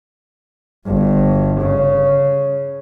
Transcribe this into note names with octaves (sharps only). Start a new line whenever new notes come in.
G1
C#3